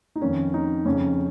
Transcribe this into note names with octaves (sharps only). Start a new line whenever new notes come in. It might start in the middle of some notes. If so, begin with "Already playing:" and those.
D#4
F2 D#3 C#4
D#4
F2 C#3 C#4